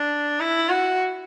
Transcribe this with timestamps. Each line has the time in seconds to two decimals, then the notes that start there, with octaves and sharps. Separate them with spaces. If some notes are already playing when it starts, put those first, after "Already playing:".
Already playing: D4
0.40 E4
0.69 F#4